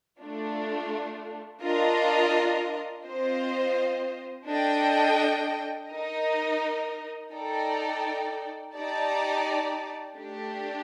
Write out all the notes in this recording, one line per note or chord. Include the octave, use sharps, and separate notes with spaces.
A3 D4 F4
D4 F4 A#4 D#5
C4 F4 C5 D#5
D4 A4 D#5 G5
D#4 A#4 D#5
D#4 A4 D5 G5
D#4 G4 D5 A5
A3 D4 G4